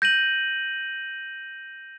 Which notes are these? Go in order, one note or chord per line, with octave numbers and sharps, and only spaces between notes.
G6 A#6 D#7 F#7